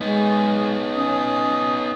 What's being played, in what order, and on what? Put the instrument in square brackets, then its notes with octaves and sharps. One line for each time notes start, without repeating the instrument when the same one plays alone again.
[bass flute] G#3 [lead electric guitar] B3 D#4
[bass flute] C#4 [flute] D#6